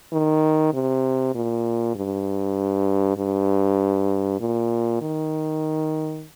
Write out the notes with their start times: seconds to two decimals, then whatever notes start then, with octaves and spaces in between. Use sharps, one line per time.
0.13 D#3
0.73 C3
1.35 A#2
1.95 G2
3.17 G2
4.40 A#2
5.01 D#3